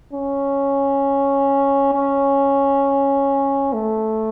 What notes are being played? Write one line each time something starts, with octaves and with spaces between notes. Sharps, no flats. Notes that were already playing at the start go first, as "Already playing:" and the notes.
C#4
C#4
A3